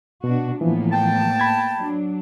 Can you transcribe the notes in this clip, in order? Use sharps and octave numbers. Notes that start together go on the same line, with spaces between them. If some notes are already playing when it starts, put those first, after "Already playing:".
B2 D4 F#4
A2 E3 F3 A#3 B3
G5 A5
B5 G#6
F#3 D4